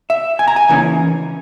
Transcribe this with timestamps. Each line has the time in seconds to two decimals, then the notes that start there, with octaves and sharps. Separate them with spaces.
0.10 E5
0.39 G#5
0.48 A#5
0.56 G#5
0.69 C#3 E3 A#3 C#4